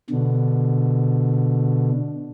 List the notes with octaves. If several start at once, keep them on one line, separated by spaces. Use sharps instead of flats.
B2 D3